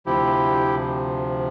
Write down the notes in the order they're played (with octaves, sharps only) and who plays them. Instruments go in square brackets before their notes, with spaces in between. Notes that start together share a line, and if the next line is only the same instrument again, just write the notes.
[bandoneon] D2 C3 F3 E4 G4